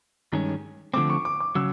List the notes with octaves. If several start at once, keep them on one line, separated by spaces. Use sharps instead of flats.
G2 D#3 G#3 C#4
D3 F3 A3 C4 D6
C#6
D6
D6
C#3 F#3 E6